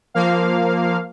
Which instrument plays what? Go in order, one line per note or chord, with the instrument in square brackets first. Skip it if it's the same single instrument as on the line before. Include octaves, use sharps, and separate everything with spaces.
[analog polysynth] F3 A#3 F5